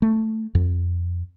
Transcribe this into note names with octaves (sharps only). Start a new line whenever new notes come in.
A3
F2